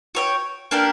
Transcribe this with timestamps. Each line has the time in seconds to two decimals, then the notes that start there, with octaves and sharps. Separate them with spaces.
0.15 F#4 C#5 E5 G5
0.71 A#3 D4 G4 A#4